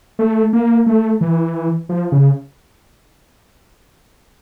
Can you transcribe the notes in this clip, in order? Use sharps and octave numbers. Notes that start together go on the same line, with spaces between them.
A3
A#3
A3
E3
F3
C#3